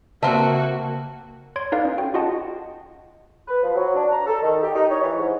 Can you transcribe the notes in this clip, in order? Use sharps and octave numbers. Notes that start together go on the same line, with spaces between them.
C#3 A#3 C4 F#4 A#4 E5 A5
C#5 C6 G#6 D7
D#4 A4 B4 D5 F5
C#4
F#4 G5
F4 F#4 G#4 D#5 F#5 A5
B4
F3
F#3
D4
A#5
A4
D#3
G4
D#4
C#5
E3
G#2